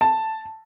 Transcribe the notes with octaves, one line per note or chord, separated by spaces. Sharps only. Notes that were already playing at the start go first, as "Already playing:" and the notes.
A5